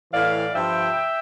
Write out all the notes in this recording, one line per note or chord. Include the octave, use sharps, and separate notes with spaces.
A2 E3 D5 F5
G2 F3 E5 G5